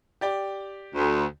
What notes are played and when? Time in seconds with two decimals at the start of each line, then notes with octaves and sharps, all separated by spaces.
0.21 G4 D5 G5
0.95 D2